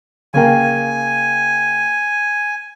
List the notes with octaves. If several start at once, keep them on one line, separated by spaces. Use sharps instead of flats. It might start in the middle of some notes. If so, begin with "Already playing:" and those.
C#3 A#3 G5 G#5